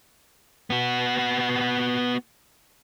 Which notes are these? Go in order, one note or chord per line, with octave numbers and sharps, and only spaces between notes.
B3 F#4